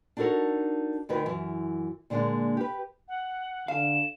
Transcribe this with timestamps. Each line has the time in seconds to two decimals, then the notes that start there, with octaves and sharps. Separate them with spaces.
0.17 D4 D#4 F#4 A4 A#4 C#5
1.09 D2 D#3 A#4 B4
1.26 F#2 E3
2.10 A#2 D3 G3 G#3 A#3 D4
2.57 G4 B4
3.08 F#5
3.68 D3 F5 E7